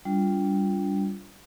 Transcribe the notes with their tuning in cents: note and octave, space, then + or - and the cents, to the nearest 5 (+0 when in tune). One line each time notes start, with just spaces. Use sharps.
G3 +0 D4 -30 F4 +0